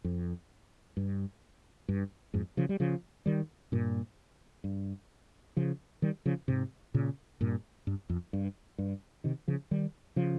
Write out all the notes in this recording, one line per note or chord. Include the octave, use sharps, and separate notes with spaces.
F2
G2
G2
F2 G#2
C#3 F3
G3
C#3 F3
D#3 G3
G2 A#2
G2
C#3 F3
D#3 G3
C#3 F3
G#2 C3
A#2 C#3
G2 A#2
G2
F2
G2
G2
C3 D#3
C#3 F3
D#3 G3
C#3 F3